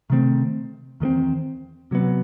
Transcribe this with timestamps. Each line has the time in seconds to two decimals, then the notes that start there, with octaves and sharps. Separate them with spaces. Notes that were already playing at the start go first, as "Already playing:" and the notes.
0.10 C3 D#3 A3 C4
1.00 E2 D#3 A3 C4
1.91 C3 F#3 B3